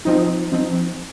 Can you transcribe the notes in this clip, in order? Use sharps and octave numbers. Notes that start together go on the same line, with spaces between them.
F3 C4 D#4
F3 C4 D#4